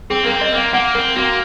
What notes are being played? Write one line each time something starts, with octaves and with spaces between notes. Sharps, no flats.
C4 G#4
A#3 A#4
C4
D#5
A#3 F5
A#3 F#5
C4 A#4
A#3 F#4